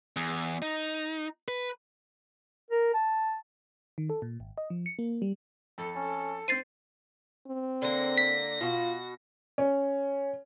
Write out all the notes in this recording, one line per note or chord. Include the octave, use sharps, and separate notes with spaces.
E2
D#4
B4
A#4
A5
D#3
A4
A#2
G#1
D#5
F3
C#7
A#3
G3
F2 A4
C#4
C4 C5 A6 C7 D#7
C4
D3 A#3 A#6
B6
B2 F4 F#4
C#4